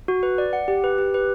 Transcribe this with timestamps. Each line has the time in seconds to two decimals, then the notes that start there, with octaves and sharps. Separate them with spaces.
0.08 F#4
0.23 B4
0.38 D5
0.53 F#5
0.68 G4
0.84 B4
0.98 G4
1.14 B4